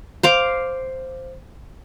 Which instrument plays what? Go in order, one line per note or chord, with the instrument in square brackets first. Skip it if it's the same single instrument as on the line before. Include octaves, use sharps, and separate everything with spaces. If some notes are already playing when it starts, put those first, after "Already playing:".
[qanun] C5 F5 D6